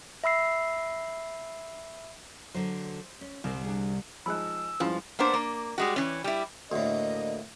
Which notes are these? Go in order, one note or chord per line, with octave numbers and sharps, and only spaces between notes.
E5 B5 E6 C7
D3 F#3 C5
C#4
C2 C4 C5
D4 G#4
F3 G#3 D#4 B5 E6 F#6
G2 F3 G#3 C#4 E4
A#3 B3 D4 C5
A#3
G3 G#3 F#4
E3 C#4
G3 E4
D2 A2 A#3 D4 D#5